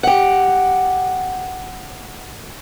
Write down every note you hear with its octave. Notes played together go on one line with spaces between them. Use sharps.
G4 F#5